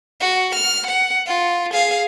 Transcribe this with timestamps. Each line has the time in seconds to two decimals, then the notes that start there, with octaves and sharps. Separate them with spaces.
0.20 F#4
0.55 F6
0.87 F#5
1.26 F4
1.73 G#4 F5